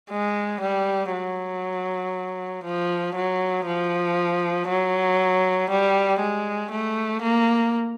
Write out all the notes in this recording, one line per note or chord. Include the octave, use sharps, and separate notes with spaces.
G#3
G3
F#3
F3
F#3
F3
F#3
G3
G#3
A3
A#3